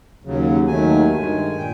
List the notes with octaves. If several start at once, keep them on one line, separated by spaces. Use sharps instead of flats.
D#2 C#3 F#3
D#2 D#3 F#3 A3 G#5
G2 D#3 G#3
A#2 G5